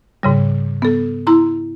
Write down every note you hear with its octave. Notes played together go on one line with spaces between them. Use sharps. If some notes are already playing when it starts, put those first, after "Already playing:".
G#2 C#3 G3
B3 A4
E4 A#5 C6